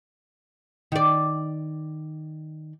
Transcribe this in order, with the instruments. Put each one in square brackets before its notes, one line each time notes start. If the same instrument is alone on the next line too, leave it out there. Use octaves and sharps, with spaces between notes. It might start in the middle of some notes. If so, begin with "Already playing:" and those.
[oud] D#3 D5